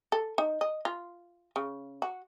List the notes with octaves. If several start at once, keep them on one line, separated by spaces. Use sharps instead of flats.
A4
D#4
D#5
F4
C#3
F#4